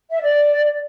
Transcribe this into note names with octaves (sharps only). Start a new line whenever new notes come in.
E5
D5